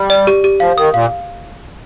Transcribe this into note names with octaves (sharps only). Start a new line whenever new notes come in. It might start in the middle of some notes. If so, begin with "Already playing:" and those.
Already playing: G3
D5
G4
G4
F3 F5
D#3 D#6
A#2 F5